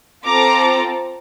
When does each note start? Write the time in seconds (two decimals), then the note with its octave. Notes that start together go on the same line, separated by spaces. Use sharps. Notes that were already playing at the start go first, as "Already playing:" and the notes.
0.23 C4 F4 A4 A#5 D6